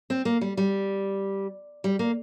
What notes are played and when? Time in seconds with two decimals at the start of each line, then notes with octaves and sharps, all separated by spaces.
0.10 C4
0.25 A#3
0.41 G3
0.57 G3
1.84 G3
1.99 A#3